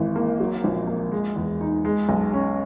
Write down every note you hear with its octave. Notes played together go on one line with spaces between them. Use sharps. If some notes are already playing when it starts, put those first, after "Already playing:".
Already playing: G#1 E3
A#3
F#3
A#1
A#3
G#3
E2
D#4
G#3
B1
C#4